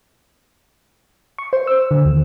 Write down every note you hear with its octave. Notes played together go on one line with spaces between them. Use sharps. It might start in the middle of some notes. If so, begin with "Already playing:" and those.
C#6
C5
E6
D3
D#2